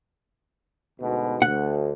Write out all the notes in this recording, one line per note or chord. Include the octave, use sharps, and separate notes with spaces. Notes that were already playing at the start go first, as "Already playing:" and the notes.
D2 G#2 B2
D2 F#5